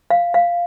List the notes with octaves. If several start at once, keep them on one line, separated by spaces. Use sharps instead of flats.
F5
F5